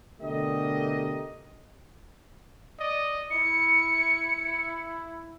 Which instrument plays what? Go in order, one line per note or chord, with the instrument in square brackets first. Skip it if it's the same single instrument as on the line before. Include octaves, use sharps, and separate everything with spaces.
[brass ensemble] B2 D3 A3 G4 A#4 D#5
[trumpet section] D5 D#5
[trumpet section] E4 [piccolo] C#7